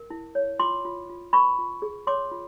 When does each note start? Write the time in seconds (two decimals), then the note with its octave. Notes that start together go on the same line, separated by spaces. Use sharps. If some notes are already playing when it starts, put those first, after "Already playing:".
Already playing: A#4
0.10 E4
0.35 C#5
0.59 F4 C6 D6
0.85 F4
1.09 F4
1.33 B4 B5 C#6
1.59 F4
1.82 G#4
2.07 C#5 C6 D6
2.32 F4